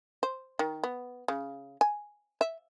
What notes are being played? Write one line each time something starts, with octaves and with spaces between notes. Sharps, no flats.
C5
D#3
B3
C#3
G#5
E5